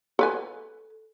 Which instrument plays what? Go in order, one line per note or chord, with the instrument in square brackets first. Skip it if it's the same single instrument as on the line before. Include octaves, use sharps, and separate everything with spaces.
[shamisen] A4 B4 G#5